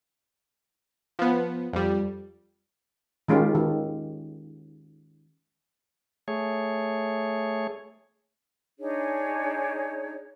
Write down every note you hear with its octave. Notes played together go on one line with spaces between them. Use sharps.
F3 B3
F2 G3
D#3 G#3 C#4 F4 G4
D#3
A3 G#4 C#5
D4 D#4 G#4 C#5